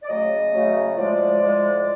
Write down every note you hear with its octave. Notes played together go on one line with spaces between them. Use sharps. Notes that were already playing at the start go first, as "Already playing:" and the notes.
D5
C#3 F#3 A3 D#5
C#3 F#3 A3
A2 F3 G#3 D5
A2 F3 G#3